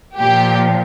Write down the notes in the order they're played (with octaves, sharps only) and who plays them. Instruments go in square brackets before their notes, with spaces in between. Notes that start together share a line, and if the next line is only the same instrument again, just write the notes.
[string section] A#2 F3 G4